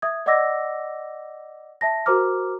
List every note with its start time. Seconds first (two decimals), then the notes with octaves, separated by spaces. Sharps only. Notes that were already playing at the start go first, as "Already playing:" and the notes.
0.02 E5 D#6 G#6
0.26 D5 D#5 F#5 D6 E6 A#6
1.81 E5 A5 A#6
2.06 F#4 A#4 C5 A#5 D6 F6